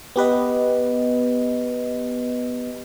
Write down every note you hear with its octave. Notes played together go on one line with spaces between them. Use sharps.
B3 G4 B4 D#5